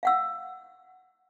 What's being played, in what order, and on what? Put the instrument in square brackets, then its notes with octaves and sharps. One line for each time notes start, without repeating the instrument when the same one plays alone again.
[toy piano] F5 F#5 E6